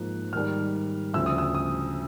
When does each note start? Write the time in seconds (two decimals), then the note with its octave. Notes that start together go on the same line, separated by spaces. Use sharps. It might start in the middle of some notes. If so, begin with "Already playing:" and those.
Already playing: G#2 F3 A#3 F#6
0.33 G#2 D#3 G3 F6
1.14 D2 C#3 F3 E6
1.26 D#6
1.38 E6
1.55 D#6